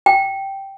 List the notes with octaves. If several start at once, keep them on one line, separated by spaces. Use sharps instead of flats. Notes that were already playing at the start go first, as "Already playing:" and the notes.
G5